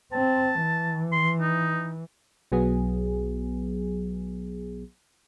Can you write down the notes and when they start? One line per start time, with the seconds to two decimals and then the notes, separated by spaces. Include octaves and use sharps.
0.13 C4 A5
0.62 E3
1.12 C6
1.41 D#4
2.52 B1 F#3 B3 G#4